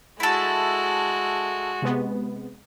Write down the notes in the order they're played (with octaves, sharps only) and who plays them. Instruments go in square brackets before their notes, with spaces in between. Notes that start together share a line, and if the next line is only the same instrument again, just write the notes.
[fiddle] G#3 F#4 [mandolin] E4 A4
[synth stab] C3 G#3 B3